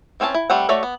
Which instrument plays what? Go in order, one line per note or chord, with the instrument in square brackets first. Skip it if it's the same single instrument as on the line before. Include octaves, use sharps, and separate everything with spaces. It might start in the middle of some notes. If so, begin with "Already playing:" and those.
[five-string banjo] E3 C4 C#4 F#4 A5
E4
G3 A3 C4 F#5
A3 F#4 C#5 D5 E5
B3